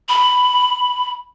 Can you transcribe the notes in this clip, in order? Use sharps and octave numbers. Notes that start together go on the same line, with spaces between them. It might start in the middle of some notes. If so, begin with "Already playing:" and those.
B5